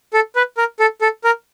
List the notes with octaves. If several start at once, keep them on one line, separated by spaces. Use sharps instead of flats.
A4
B4
A#4
A4
A4
A#4